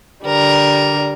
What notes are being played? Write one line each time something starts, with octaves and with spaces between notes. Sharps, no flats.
D3 G3 A#4